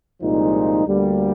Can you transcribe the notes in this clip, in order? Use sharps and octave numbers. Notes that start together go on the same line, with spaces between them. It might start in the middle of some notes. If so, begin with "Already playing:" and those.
C2 A#2 F3 G#3 D#4
D2 D3 G3 A#3